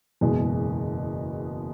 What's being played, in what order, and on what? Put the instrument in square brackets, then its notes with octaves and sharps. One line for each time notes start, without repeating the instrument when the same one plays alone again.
[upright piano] F#1 E2 B2 G#3